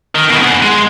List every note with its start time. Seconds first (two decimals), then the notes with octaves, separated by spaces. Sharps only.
0.15 D#3
0.30 E2 B2
0.43 G#4 F#5
0.62 G#3